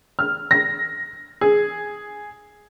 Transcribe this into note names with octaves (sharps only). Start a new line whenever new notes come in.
F6
A#6
G#4